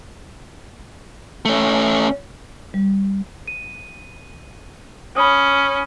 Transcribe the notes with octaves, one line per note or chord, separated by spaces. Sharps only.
A3 C#4
G3
D#7
C#4 B5 D#6